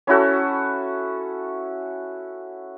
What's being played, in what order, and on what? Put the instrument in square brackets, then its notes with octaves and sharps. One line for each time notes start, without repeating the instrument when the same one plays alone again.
[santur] C#4 E4 F#4 A4